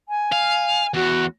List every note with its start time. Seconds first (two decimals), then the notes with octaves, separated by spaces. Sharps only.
0.08 G#5
0.32 F5
0.94 E2 F#4